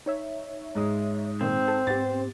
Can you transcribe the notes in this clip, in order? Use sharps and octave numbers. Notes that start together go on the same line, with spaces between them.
D#4 C#5 E5
G#2 G#3 D#6
A#2 D#3 A3 C4
A4
G#2 B3 G4 A6